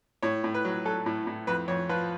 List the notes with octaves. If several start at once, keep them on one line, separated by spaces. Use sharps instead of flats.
A2 C#5
A2
B4
F#3
F#3 A4
A2
A2
F2 B4
F2 C#5
F3 B4